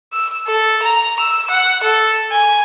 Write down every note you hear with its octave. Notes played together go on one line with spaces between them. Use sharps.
E6
A4
A#5
E6
F#5
A4
G#5